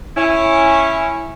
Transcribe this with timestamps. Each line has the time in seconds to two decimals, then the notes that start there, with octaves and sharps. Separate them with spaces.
0.16 C#4 E4